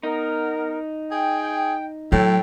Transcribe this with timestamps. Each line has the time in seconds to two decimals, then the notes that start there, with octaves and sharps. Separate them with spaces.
0.03 B3 D#4 A#4
1.11 G#4 G5
2.12 A2 F#3 A4 G5